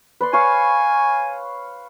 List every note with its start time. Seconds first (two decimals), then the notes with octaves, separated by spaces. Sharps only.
0.21 B4 D5 C6
0.33 C#5 F5 G#5 C#6